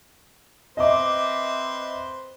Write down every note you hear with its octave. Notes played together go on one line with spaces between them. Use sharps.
C4 B4 C5 D#5 E5 D6